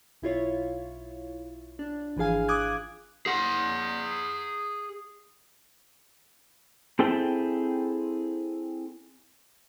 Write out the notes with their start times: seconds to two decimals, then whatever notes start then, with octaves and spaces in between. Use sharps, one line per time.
0.22 B1 E4 F4 C#5
1.79 D4
2.17 G#1 E3 F3 G#4 F5 G#5
2.48 D6 D#6 F#6 G#6
3.26 G#4 F#5
6.99 C4 E4 G#4 A4 G5